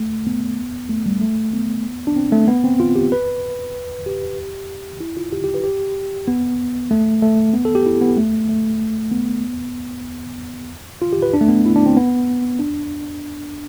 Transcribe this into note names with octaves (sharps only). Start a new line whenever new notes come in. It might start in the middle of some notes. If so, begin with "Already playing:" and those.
Already playing: A3
B3
A3
G3
A3
B3
D4
C4
A3
B3
C4
F4
G4
B4
G4
E4
F4
G4
G4
B4
G4
B3
A3
A3
B3
A4
G4
E4
B3
A3
A3
B3
F4
G4
B4
D4
A3
B3
E4
D4
C4
B3
D4